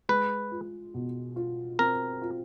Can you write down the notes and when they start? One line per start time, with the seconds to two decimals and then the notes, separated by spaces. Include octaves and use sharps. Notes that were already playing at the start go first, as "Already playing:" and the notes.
0.09 G#3 B4
0.51 F4
0.94 B2
1.36 F4
1.79 C4 A#4
2.22 F4